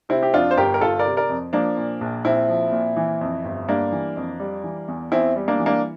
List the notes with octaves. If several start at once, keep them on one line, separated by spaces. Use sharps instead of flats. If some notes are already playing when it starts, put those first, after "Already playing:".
C3 C4 E4
G4
F2 D4 F4
C5
G1 G4 A#4
A#4
G1 F4 A4
A#4 D5
C3
A#4 D5
F2
F3 A#3 D4
A#2
A#1
A#1 C4 E4
F3
A#2
E3
F2
G1
G3 A#3 D4
E3
F2
G3
E3
E2
E2 C4 E4
G3
A#3 D4
E3
A#3 D4